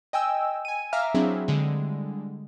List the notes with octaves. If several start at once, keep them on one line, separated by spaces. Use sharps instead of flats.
D#5 G5 G#5 E6
G#5 D#7
E5 F5 A#5 D6 F6
F#3 C4 D4 E4 G#4 E5
D3 G3 G#3